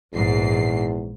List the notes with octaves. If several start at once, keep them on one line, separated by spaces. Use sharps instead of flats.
A#1 E2 G#2 C7